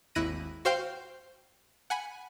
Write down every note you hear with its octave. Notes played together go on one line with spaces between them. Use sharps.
G#1 D#2 E4 F#6 A#6 D#7
F#4 C5 F5 G5
F#5 G#5 B5